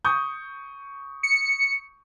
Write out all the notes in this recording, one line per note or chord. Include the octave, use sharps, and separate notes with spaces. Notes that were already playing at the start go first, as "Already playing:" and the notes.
C#6 D#6 G6
C#7